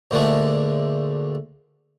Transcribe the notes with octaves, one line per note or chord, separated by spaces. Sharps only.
D2 A#2 D3 G#3 A3